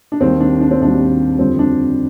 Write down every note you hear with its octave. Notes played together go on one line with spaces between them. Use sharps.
D4
D#2 D#3 G3 C4
D4
D4
C4
D#2 D#3 G3 D4
F2 D3 G3 C4
D4